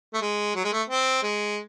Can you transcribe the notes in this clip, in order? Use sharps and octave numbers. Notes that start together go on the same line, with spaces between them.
A3
G#3
F#3
G#3
A3
C4
G#3